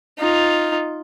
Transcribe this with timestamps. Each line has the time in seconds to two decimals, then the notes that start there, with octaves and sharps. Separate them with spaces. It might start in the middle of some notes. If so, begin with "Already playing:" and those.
0.19 D#4 F4